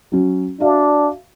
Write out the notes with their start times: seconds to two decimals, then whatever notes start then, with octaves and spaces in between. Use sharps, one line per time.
0.12 F#3 C#4
0.60 D4 F#4 E5 F5